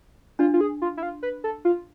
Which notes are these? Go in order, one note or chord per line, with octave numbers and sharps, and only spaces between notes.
D4 F4
F4
G#4
F4
E4
F4
B4
A4
F4